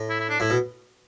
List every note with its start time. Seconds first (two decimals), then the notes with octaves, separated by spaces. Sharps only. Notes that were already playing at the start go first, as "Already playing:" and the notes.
Already playing: A2
0.10 E4
0.20 E4
0.29 D4
0.40 A2 E4
0.50 B2